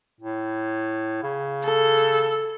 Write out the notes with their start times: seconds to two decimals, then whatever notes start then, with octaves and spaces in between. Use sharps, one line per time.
0.21 A2
1.23 C#3
1.64 A4